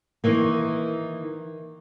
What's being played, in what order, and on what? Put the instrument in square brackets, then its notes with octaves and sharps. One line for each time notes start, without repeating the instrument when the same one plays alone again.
[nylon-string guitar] D#3 E3 A#3